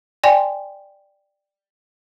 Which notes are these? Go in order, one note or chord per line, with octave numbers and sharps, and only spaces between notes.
D5 G5 G#5 C6